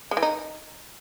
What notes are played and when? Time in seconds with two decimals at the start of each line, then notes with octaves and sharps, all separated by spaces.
0.11 G#3
0.17 E3
0.22 D#4